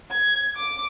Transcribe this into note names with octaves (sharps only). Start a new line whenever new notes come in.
G#6
D6